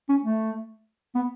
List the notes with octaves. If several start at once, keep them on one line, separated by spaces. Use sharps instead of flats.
C#4
A3
B3